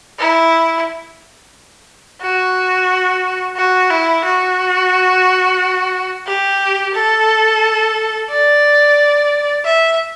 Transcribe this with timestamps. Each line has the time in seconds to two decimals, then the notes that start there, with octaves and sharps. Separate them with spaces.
0.19 E4
2.22 F#4
3.57 F#4
3.90 E4
4.25 F#4
6.27 G4
6.95 A4
8.30 D5
9.65 E5